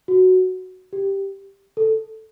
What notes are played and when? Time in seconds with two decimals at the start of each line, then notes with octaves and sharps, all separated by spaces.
0.08 F#4
0.93 G4
1.77 A4